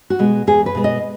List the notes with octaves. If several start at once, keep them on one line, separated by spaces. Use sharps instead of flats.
F#4
B2 G#3
E2 G#4
B4
B2 G#3
D#5